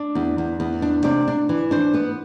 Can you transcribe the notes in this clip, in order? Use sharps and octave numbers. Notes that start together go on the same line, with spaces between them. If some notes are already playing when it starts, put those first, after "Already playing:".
Already playing: D4 D5
E2
E2
E2
D4
C3 D5
D4
E3
D4 C5
B3 B4